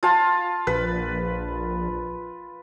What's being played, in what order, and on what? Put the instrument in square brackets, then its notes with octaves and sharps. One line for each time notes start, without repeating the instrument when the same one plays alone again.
[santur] F4 A5
[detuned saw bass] A#1 [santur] B4